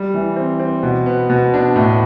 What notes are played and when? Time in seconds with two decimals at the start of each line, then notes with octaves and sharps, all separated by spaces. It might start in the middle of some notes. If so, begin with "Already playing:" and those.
Already playing: G3
0.14 E3
0.37 C4
0.60 C4
0.83 B2
1.06 B3
1.30 B2
1.54 D4
1.76 A2